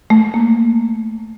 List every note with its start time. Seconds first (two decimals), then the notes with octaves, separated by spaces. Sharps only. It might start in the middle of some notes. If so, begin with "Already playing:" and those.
0.10 A3
0.34 A#3